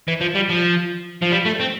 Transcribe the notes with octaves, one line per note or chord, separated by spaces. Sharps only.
E3
F3
G3
F3
F3
G3
A3
C4